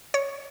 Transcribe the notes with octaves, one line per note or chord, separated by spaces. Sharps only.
C#5